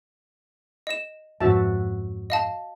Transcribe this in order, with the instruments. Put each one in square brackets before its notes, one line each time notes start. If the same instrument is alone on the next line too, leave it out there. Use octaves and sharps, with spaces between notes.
[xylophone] D#5 E7
[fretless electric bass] F2 G#2 F3 [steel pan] F#4 E5 A5
[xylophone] D#5 F5 A5